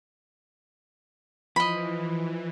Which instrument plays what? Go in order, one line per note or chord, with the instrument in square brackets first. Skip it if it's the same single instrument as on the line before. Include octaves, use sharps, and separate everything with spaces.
[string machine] E3 [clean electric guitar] F3 [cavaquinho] D#5 B5